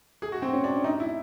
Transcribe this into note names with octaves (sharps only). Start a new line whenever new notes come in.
G#4
F#4
C4
C#4
D4
D#4
E4